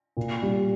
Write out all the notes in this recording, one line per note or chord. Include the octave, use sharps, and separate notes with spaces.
A#2
G3